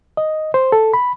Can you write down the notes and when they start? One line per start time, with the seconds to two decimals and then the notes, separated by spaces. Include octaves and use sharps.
0.17 D#5
0.54 C5
0.72 A4
0.94 B5